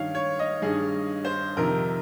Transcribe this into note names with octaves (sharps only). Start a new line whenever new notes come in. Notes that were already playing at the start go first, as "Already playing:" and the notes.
Already playing: G2 D#3 C#5 F5
C#5
D#5
G2 D#3 G#4
C5
F2 C3 D#3 A#4